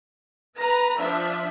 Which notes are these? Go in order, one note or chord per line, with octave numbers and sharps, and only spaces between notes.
B4 A#5
F3 D4 E5